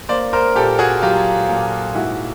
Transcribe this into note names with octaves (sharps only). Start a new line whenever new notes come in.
A#3 C5 D5
A#4 C5
A#2 G4 A4
F#4 G#4
F#3 F4 G4
A#2
G#2 E4 F#4